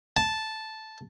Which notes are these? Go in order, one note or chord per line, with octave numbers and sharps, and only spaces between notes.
A5